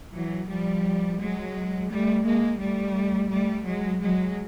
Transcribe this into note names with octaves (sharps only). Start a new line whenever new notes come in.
E3 F#3
F3 G3
F#3 G#3
G3 A3
G#3 A#3
G3 A3
G3 A3
F#3 G#3
F#3 G#3